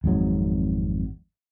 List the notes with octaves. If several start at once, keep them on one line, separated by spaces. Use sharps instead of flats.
G#1 F2 G#2 F#3